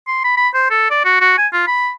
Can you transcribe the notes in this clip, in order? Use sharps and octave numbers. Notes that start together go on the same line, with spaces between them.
C6
B5
B5
C5
A4
D5
F#4
F#4
G#5
F4
B5